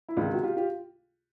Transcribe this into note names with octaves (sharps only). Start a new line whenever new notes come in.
E4
C#2 C3 D#3 D#4 F4
F#4
F4 G4
F4 G4